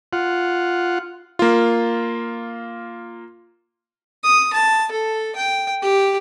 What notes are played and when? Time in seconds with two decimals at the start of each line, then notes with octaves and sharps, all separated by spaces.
0.13 F4 F#5
1.39 A#3 F4
4.24 D#6
4.53 A5
4.91 A4
5.36 G5
5.82 G4